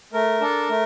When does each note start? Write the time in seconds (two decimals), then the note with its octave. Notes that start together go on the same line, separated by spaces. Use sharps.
0.13 A3 A#4
0.41 D4 A4
0.69 A3